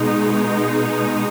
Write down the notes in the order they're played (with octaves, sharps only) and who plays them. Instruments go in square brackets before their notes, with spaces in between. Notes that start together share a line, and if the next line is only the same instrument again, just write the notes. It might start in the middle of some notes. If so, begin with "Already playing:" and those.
Already playing: [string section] B2 G#3 D#4